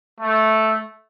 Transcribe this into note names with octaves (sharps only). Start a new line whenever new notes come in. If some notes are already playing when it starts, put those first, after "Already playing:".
A3